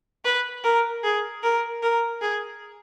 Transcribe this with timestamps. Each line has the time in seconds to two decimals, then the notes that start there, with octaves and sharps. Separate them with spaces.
0.25 B4
0.64 A#4
1.04 G#4
1.43 A#4
1.82 A#4
2.21 G#4